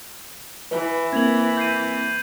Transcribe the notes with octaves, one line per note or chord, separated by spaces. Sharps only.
E3 B4
A#3 C4 G#6 F7 F#7
G6 C7 D#7